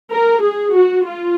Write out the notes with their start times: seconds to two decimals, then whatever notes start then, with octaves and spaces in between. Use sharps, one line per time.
0.10 A#4
0.42 G#4
0.75 F#4
1.06 F4